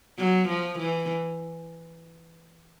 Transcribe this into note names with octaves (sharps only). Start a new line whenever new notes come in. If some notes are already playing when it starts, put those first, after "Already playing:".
F#3
F3
E3